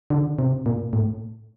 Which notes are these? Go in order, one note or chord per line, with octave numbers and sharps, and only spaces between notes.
D3
C3
A#2
A2